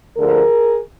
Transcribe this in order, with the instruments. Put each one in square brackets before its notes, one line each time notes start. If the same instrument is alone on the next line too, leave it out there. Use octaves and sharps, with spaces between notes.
[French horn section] D2 D3 F3 G#4 A#4